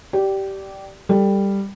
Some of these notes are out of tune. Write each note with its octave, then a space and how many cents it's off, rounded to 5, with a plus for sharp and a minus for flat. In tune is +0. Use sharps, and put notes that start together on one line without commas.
G4 -15 D5 +0
G3 +10 A4 +0